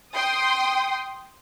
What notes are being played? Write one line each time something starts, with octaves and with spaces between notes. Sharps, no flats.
G5 C6 D#6